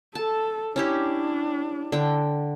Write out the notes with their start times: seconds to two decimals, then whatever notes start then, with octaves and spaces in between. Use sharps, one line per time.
0.15 A4 A5
0.76 C#4 D4 E4 G4
1.92 D3 G5